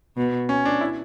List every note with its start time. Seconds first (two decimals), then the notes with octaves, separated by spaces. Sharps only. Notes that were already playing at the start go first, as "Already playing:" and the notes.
0.17 B2
0.49 C#4
0.65 D4
0.81 E4